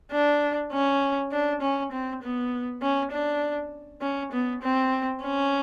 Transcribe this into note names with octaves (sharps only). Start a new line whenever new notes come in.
D4
C#4
D4
C#4
C4
B3
C#4
D4
C#4
B3
C4
C#4